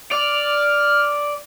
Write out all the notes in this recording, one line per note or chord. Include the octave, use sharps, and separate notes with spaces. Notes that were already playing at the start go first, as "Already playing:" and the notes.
D5 F6